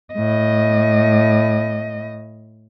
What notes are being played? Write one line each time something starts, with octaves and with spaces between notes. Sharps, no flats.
A2 D#5